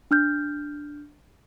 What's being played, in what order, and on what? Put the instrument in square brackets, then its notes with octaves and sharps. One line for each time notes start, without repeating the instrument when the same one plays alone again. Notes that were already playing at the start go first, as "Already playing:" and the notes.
[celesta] D4 F6 G6